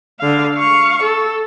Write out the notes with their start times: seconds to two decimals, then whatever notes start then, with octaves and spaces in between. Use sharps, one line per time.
0.20 D3 F5
0.55 F5 C#6
1.03 A4